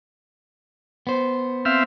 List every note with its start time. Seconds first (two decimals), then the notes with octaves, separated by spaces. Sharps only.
1.07 B3 C5
1.65 C4 E5 F5